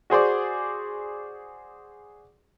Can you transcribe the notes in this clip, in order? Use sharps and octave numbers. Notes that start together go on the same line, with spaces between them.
F#4 G#4 C5 D5